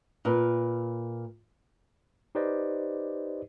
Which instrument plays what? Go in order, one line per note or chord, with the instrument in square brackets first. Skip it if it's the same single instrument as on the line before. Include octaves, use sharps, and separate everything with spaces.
[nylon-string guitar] A#2 A#4 B4
[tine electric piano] D#4 G4 B4 C5 D5 D#5